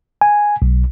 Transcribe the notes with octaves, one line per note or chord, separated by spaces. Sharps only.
G#5
B1